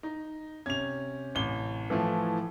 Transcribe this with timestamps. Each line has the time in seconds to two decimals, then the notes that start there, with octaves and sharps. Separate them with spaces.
0.03 D#4
0.66 C3 C#4 G#6 F7
1.35 A1 G7
1.90 A2 E3 F3 A3